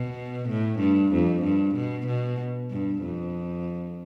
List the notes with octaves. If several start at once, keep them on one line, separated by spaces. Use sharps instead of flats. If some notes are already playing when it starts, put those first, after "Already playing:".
Already playing: B2
A2
G2
F2
G2
B2
B2
G2
F2